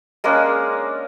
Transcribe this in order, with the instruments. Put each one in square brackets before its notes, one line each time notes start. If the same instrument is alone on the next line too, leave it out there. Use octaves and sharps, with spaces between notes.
[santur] G#3 A#3 C#4 D4